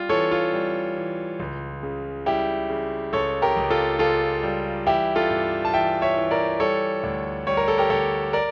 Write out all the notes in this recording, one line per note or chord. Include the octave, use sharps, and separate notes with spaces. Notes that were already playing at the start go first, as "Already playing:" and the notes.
Already playing: G3 F4
E3 A4 C#5
F4
G3
E3
C#2
C#3
G3 E4 G4
C#3
C#2 A4 C#5
G4 A#4
C#2
F4 A4
C#2 F4 A4
G3
E3 E4 G4
F4 A4
G2
A5
E3 E5 G5
C#5 E5
E3
A#4 D5
G3 A4 C#5
D2
G3 C#5
A#4
A4
G4 A#4
D2 A4 C#5
A#4 D5